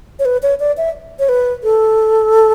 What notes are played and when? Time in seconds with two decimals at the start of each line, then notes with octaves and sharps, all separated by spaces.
0.19 C#5
0.25 B4
0.43 C#5
0.60 D5
0.77 E5
1.19 C#5
1.29 B4
1.64 A4